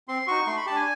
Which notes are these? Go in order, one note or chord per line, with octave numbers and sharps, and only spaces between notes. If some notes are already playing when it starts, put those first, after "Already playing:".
C4 C6
D#4 F#4 C#6
A3 C6
B5
G4 A5
D4 G#5